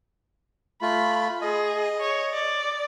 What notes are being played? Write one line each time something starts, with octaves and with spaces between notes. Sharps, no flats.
A3 F4 B5
G#4 D#5
C#5
D5